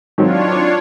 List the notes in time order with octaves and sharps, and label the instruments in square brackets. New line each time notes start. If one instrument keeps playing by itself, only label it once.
[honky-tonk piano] D#3 F#3 C4 [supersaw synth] D4 F4 C#5